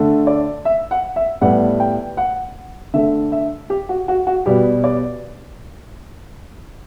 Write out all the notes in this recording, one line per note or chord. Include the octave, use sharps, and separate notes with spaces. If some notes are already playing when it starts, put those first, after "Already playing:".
Already playing: D3 A3
D5
E5
F#5
E5
A2 G3 B3 F#5
G5
F#5
D3 A3 E5
E5
G4
F#4
F#4
F#4
B2 G3 B3 G4
D5